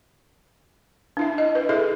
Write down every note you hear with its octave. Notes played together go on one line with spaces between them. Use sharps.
D4 E4 E5
D#5
B4
E4 G#4 A4 B4 E5